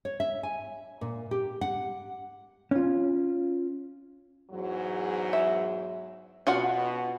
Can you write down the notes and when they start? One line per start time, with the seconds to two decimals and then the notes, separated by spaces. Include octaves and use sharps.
0.05 C#5
0.20 E5
0.43 G#5
1.01 A#2
1.31 G4
1.61 F#5
2.71 C#4 F4
4.50 E2 G#2 F#3
5.33 E5
6.47 B2 F4 F#4 F#5